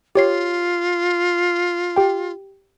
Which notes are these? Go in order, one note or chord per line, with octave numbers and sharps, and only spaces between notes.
F4 G4 C#5 C7
G4 G5